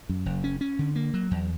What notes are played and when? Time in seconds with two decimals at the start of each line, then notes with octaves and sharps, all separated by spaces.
0.09 F#2
0.26 F#1
0.44 C#4
0.61 C#4
0.79 D3
0.96 A#3
1.14 F#3
1.31 E2